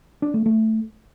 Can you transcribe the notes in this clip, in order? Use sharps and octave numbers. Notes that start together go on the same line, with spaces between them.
D4
A3
A3